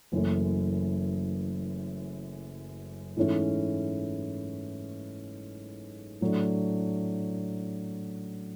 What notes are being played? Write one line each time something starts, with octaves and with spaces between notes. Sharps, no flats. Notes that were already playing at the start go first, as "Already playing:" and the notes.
F#1 F#2 E3 A3 C#4
G#2 E3 A3 C#4 E4
A2 F#3 A3 D4